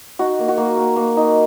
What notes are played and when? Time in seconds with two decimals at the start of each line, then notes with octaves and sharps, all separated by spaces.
0.19 D#4 F#4
0.39 A#3
0.48 F#4
0.58 A#3
0.78 A#3
0.96 A#3
1.17 D#4